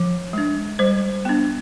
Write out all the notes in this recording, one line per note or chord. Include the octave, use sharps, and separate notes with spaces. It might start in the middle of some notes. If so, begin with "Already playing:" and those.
Already playing: F3
G#3 D4
G3 C5
B3 D4